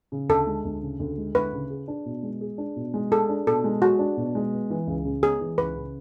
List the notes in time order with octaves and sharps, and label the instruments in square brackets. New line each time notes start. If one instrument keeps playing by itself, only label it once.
[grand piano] C#3
[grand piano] D2 [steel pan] A4
[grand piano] G#3
D2
C#3
D2
G#3
[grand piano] D2 [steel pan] B4
[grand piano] C#3
G#4
D4
B2
G#3
G#4
D4
B2
G#3
[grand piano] G#4 [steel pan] A4
[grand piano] D4
[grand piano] B2 [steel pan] A4
[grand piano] G#3
[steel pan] F#4 [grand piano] G#4
[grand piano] D4
B2
G#3
B3
E3
C#2
C#3
[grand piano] B3 [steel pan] G#4
[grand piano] E3
[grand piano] C#2 [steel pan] B4
[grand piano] C#3